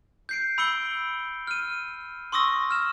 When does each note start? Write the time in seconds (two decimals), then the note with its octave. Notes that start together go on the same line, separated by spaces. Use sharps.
0.29 G6 C7 D7
0.58 B5 E6 C#7 D7 G7
1.47 F6 D#7
2.32 C6 C#6 D#6 E6 A#6
2.71 F6 E7